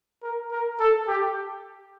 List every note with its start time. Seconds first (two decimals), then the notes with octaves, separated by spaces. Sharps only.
0.23 A#4
0.52 A#4
0.80 A4
1.08 G4